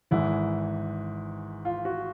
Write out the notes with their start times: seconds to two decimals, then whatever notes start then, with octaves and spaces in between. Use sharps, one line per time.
0.11 G#1 G#2 E3 E4
1.65 F4
1.85 F#4